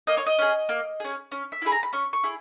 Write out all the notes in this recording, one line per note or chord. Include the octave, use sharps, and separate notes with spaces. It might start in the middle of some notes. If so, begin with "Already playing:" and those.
A#3 D#5
C#5
D#5
C#4 G#4
A#3
C#4 G#4
C#4
E5
E4 G#4 B5
A#5
B5
C#4 C#6
C#6
E4 G#4